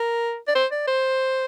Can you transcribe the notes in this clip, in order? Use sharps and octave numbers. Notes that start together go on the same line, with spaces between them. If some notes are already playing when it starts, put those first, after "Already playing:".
Already playing: A#4
D5
C5
D5
C5